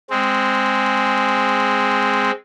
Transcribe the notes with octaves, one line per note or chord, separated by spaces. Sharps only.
G#3 C4